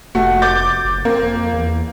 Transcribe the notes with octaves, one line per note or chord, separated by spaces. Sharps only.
F1 A3 F#4
D6 G6 A6
F#1
A#3 C4
F2
E2